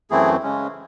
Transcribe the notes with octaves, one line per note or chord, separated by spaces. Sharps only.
F#2 E3 A3 C4 E4 G#4
C#3 G#3 C#4